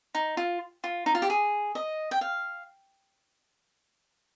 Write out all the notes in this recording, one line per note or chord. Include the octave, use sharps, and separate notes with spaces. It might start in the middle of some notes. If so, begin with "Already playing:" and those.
D#4
F4
F4
D#4
F4
G4
G#4
D#5
G5
F5